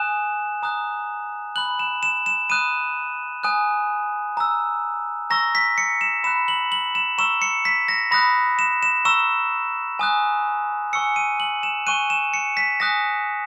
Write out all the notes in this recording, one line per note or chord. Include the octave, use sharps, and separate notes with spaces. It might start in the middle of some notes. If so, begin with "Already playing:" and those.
Already playing: G#5 D#6 F#6 E7
A#5 D#6 F#6
B5 F#6 F#7
E7
E7
E7
B5 D#6 F#6 D#7
G#5 D#6 F#6
A#5 E6
A#5 C#6 E6 A#6
B6
C#7
E7
B5 F#6 E7
F#7
F#7
E7
A#5 C#6 E6 E7
C#7
B6
A#6
B5 D#6 F#6 A#6
E7
E7
A#5 C#6 E6 E7
G#5 D#6 F#6
G#5 C#6 E6 C#7
D#7
F#7
E7
G#5 C#6 F#6 D#7
E7
C#7
B6
G#5 D#6 F#6 A#6